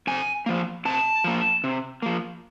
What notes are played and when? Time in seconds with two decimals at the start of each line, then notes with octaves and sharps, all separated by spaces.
0.07 C3 G#5
0.46 F3 A#3
0.85 C3 A5
1.24 F3 A#3
1.64 C3
2.02 F3 A#3